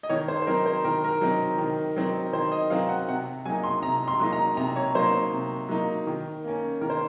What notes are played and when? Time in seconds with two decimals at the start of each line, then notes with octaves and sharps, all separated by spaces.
0.03 D#5
0.10 D#3 C#5
0.28 C5
0.42 C5
0.47 F#3 C4 D#4 A#4
0.66 C5
0.85 D#3 A#4
1.04 A#4
1.21 F#3 C4 D#4
1.58 D#3
1.96 F#3 C4 D#4
2.33 D#3 C5
2.52 D#5
2.70 F#3 C4 D#4 F5
2.89 F#5
3.08 C3 F#5
3.45 F#3 A#3 D#4 G#5
3.64 C6
3.83 C3 A#5
4.08 C6
4.20 F#3 A#3 D#4 C6
4.33 A#5
4.57 C3 A#5
4.76 C#5
4.95 F#3 A#3 D#4 C5
5.32 C3
5.69 F#3 A#3 D#4
6.07 D#3
6.44 A#3 C#4
6.81 D#3 A#4
6.90 C5